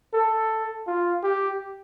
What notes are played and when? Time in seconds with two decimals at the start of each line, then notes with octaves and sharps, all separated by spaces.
0.14 A4
0.87 F4
1.23 G4